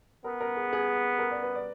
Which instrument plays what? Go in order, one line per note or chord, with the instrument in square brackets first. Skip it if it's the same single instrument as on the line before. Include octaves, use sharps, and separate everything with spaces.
[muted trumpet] B3 [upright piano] A#4
[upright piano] A#4
G#4
G#4
A#4
D5
B4
D5